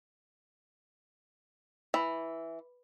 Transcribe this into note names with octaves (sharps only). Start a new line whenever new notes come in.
E3